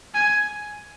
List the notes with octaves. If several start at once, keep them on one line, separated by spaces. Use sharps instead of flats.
G#5